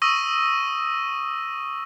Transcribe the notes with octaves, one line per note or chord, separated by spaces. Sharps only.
C#6 D#6 E6 A#6 D#7